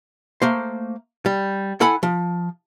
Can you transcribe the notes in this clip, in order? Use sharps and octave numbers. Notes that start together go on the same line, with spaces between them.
A3 A#3 C5
G3
E4 A4 F#5 G#5 B5
F3